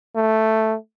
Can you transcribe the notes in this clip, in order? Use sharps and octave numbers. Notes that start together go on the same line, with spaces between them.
A3